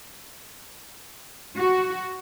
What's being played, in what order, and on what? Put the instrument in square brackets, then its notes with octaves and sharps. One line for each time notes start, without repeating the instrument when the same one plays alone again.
[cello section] F#4